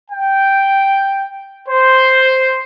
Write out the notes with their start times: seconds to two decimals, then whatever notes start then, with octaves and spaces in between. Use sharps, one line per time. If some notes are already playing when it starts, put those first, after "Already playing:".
0.11 G5
1.69 C5